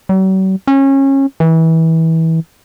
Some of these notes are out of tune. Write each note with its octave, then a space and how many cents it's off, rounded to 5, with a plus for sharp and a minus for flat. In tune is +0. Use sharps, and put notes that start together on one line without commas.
F#3 +45
C#4 -25
E3 -25